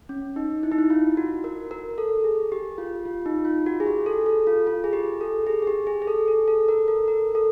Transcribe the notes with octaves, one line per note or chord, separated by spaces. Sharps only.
C#4
D#4
E4
D#4
E4
F4
F#4
A#4
A#4
A4
G#4
G4
F4
F4
D#4
F4
F#4
G#4
G4
A4
A4
F4
F4
G#4
G4
A4
G#4
G#4
G4
G#4
G#4
A4
A4
A4
A#4
A4
A#4
A4